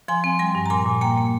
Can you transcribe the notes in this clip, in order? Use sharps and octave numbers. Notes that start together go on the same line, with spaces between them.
F3 G#5 C6
C4
G3 G#5 C6
G2
A#5
A#2 G#5 C6
A#2
A#3 G5 A#5
A#3